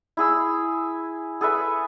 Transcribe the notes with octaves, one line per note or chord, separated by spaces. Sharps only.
E4 G#4 E6
G#4 A4 B4 E5